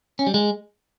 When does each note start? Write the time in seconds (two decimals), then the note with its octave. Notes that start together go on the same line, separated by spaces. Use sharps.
0.19 C#4
0.27 G3
0.34 G#3